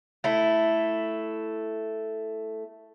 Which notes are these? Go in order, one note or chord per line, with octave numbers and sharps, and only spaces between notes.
A3 E4